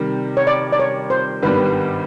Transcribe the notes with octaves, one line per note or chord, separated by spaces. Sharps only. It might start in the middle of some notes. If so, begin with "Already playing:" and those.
Already playing: C3 D#3 G3
C#5
D5
D5
C#5
C5
G#1 G2 D#3 G3 B3 B4